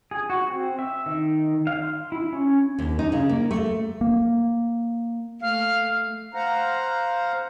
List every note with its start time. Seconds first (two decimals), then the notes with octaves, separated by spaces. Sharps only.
0.11 G#4
0.30 F#4
0.48 C4
0.79 E5
1.06 D#3
1.67 F5
1.83 C6
2.12 E4
2.32 C#4
2.79 D#2
2.99 D#4
3.12 C#3
3.29 A#3
3.51 A3
4.01 A#3
5.41 A3 F5
6.34 C5 F5 F#5 A#5